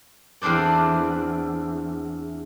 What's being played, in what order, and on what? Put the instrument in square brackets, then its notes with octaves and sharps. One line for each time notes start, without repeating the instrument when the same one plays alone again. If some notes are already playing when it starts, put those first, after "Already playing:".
[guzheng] E2 C4 D4 C5 D5